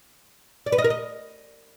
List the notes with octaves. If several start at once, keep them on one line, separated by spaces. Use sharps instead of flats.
D5
B4
D#5
A#4
D#5